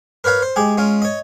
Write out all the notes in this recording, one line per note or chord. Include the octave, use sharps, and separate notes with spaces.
A#4 B4 C#5 F5 A#5
C5
G#3 G4 G#4
G#3 C#4 F4
C#5 D#5